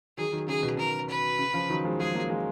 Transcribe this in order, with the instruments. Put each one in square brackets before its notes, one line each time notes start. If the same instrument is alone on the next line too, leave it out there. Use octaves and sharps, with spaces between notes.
[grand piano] D#3 F#3 [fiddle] G#4
[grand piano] D#3 F#3
[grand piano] C#3 [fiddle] G#4
[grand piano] B2
[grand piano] B2 [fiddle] A#4
[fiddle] B4
[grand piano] C#3
C#3 F3
D#3 F#3
F3 G#3
[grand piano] F3 G#3 [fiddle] G#4
[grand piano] F#3 A#3
F3 G#3